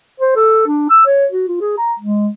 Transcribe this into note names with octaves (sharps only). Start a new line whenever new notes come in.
C5
A4
D4
E6
C#5
F#4
F4
G#4
A#5
G#3